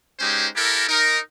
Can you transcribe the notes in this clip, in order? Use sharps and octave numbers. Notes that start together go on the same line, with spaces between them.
G#3 C#4 D#4 G4 C5
E4 G4 A4 A#4
D#4 A#4